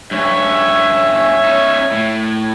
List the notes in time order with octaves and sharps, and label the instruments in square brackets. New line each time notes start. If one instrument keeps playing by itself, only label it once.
[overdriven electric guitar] G2 C#4 [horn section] C#5 E5
[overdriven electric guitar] C#4 D#4
A2